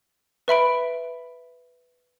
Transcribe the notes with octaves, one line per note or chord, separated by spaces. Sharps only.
B4 E5 B5 D7